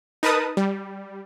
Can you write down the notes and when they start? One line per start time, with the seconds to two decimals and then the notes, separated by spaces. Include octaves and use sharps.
0.23 D#4 A#4 B4 A5 D#6
0.57 G3